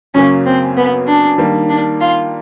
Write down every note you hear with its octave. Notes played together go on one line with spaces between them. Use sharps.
F#2 C#3 F#3 A#3 C#4
C4
B3
D4
D#3 G3 A#3 D#4
D4
F4